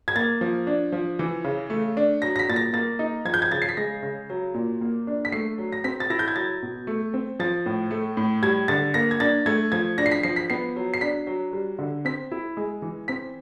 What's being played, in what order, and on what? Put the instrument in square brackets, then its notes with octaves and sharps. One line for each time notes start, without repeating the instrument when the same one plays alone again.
[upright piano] G#6
A#3 A6
F3
D4
F3
E3
C#3
A3
D4
F#3 A#6
A#6
B6
A#2 A6
A#6
A#3 A6
D#4
F3 G#6
G6
G#6
C#3 A6
C7
B6
G#3 A#6
C#3
F#3
A#2
A#3
D4
B6
A3 C7
F#3
A#6
C4 B6
A6
E4 A#6
G6
G#6
F#3 A6
B2
A3
C4
F3 A6
A2
A3
A2
G3 G#6
D3 A6
A#3 A#6
G#6
D4 A6
A3 G#6
F3 G#6
D4 A#6
C7
B6
F3 C7
B6
B3 C7
F#3
C7
D4 B6
F#3
G3
D3
C4 B6
E4
G#3
E3
C4 B6